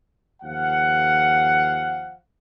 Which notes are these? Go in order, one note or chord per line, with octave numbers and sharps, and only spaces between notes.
D#2 F3 F5 F#5